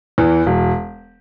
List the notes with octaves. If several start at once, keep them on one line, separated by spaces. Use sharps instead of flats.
E2 E3
E1